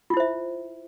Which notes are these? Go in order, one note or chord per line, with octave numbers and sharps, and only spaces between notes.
E4 F4 C5 E5